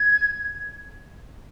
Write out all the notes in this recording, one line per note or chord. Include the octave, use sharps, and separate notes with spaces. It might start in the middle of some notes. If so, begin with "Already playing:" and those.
Already playing: G#6